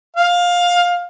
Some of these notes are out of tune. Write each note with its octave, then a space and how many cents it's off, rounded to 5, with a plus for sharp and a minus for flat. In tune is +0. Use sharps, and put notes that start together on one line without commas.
F5 +15